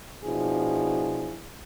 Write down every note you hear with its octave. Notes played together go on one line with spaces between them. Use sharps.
B2 F3 D4 E4 G#4